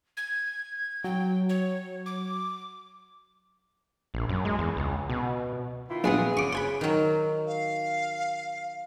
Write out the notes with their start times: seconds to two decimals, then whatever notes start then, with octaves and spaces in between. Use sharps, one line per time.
0.17 G#6
1.04 F#3 G5
1.49 C#5
2.06 D6
4.14 A#1
4.29 F#2
4.45 G#3
4.59 E2
4.77 C#2
5.10 B2
5.89 D#3 E4 F4
6.04 A#1 F#3 B3 G#4
6.37 C#3 C#6 D6
6.53 C5 G#5 B5
6.81 D#3 F#3
7.47 F5